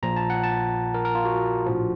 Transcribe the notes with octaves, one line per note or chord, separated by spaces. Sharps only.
A#1 A#2 F3 A#5
A5
F#5
A5
A#4
A#4
F4
F#4
A#1 A2 F3